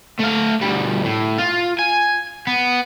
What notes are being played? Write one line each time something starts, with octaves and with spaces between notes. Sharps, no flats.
A3 F5
D2 G3
A2
F4
G#5
B3